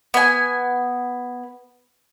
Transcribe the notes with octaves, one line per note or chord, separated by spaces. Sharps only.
B3 G#5